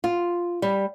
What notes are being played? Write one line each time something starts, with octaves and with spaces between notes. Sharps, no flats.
F4
G3